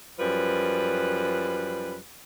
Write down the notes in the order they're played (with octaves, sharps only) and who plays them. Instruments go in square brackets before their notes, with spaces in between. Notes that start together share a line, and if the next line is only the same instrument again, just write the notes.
[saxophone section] F#2 F3 G3 B4